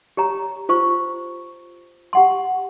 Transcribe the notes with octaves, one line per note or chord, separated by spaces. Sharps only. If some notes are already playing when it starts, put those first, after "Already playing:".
G4 C#5 A#5
F4 C5 C#6
G4 F#5 C6